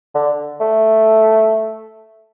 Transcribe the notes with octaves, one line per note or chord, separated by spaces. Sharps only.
D3
A3